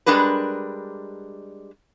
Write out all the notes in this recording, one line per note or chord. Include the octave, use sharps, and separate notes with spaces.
G3 G#3 D4 A#4 B4